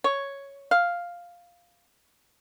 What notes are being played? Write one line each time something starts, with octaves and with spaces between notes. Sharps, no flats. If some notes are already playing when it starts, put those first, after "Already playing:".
C#5
F5